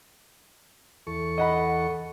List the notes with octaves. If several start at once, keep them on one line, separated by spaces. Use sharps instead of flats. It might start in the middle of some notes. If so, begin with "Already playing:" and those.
E2 A4 C#6
D#5 F#5 B5